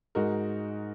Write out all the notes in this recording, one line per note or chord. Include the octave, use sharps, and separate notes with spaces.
G#2 G#3 D#4 F#4 A#4